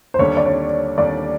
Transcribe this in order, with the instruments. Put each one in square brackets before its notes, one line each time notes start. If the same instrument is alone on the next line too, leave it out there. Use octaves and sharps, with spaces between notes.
[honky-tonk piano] C5
[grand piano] D#2 D3 G3 [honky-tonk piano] C#5
[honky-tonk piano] D5
C#5
[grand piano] D#2 D3 G3 [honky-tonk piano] D5